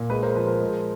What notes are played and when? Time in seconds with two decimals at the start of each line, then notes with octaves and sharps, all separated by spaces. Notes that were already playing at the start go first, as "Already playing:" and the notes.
Already playing: A#2
0.10 G#3 B4
0.23 A#4 C5
0.35 F3 B4
0.47 A#4
0.60 G#3